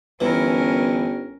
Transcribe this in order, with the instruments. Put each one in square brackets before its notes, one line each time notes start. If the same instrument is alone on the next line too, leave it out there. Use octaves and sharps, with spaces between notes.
[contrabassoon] G1 [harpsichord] E3 [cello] C#4 A#4